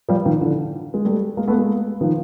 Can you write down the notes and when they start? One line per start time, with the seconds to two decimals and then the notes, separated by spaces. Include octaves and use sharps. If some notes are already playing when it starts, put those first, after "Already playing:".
0.09 F3 G3
0.25 D#3 F3
0.41 D3 E3
0.94 G#3
1.05 G3 A3
1.37 G#3 A#3
1.48 A3 B3
1.58 G#3 A#3
2.01 D#3 F3